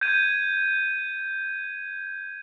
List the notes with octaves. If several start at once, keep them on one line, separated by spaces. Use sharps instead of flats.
G6 G#6 D#7